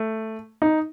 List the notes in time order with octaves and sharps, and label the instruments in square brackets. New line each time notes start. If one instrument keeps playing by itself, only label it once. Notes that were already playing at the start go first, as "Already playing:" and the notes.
Already playing: [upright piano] A3
D#4